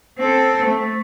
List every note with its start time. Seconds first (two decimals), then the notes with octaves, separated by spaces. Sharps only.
0.19 C4 A4
0.66 A3